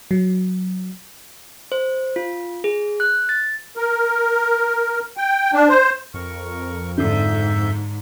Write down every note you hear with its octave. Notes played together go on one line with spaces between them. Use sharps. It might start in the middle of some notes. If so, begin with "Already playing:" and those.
F#3
C5
F4
G#4
F#6
A6
A#4
G5
D4
C5
F2 A#4 C#6
G#2 D3 E5 G6